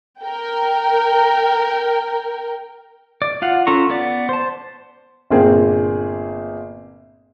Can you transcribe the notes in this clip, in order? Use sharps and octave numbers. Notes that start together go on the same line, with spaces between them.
A#4 G5
D5
F4 F5 F#5
C#4 F4 A4 A#5 C#6
B3 D5
C5 A5
G1 A#2 A#3 C4 G#4